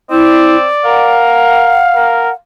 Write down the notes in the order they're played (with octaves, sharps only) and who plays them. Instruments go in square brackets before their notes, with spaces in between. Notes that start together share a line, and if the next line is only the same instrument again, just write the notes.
[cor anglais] C4 [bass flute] E4 [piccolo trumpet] D5
[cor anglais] A#4 [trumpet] F5 [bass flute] F#5
[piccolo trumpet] A#4